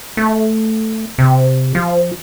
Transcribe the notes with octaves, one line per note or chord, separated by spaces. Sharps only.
A3
C3
F3